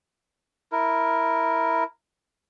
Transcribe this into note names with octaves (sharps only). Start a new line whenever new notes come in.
E4 A#4